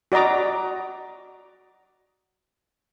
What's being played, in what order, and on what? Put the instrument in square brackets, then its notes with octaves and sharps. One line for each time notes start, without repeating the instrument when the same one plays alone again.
[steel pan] F#4 D5 D#5 A#5 D6